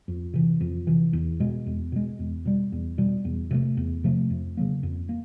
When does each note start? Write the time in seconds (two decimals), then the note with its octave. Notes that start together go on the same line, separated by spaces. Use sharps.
0.08 F2
0.34 C3 E3
0.61 F2
0.87 C3 E3
1.13 E2
1.40 B2 G#3
1.66 E2
1.92 B2 G#3
2.19 E2
2.45 B2 G3
2.72 E2
2.98 B2 G3
3.25 E2
3.51 C3 F3 A3
3.77 E2
4.04 C3 F3 A3
4.30 F2
4.57 C#3 F#3 A#3
4.83 F2
5.09 A#3